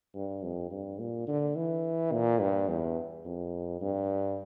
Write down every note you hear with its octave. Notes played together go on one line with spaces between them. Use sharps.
G2
F2
G2
A#2
D3
E3
A#2
G2
E2
F2
G2